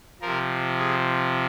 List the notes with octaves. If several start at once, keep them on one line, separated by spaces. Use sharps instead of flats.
C3 F3 A#4
G#4